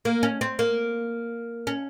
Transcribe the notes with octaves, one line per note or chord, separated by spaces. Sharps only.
A#3
C#4
C4
A#3
C#4